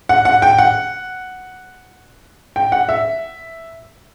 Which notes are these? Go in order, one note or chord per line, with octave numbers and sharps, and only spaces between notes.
F#5
F#5
G5
F#5
G5
F#5
E5